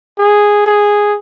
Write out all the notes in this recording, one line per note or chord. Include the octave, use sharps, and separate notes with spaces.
G#4
G#4